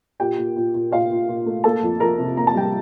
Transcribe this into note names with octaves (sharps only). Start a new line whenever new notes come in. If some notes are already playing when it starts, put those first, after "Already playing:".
A#2 G4 G5
A#2
A#2
A#2
A#2 F4 F5
A#2
A#2
A3
A#3 A4 A5
F2
F2 A#4 A#5
C3
A#3 A#5
A5
G3 G5